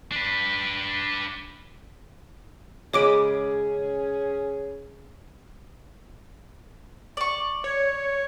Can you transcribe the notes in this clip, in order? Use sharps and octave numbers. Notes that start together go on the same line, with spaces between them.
D4 B4
C#3 G#3 C#4 G#4 C#5 B5 D6 D7
D5 C#6
C#5